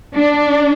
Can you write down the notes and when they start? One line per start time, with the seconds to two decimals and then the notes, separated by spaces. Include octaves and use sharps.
0.14 D4